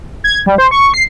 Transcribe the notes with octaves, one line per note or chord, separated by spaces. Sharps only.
G#6
G3
C5
C#6
C7